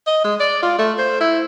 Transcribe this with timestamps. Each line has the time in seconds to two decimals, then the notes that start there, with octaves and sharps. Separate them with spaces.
0.07 D#5
0.24 G#3
0.40 D5
0.63 F4
0.79 A3
0.99 C5
1.21 E4